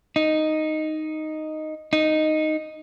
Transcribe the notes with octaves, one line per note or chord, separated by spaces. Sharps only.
D#4
D#4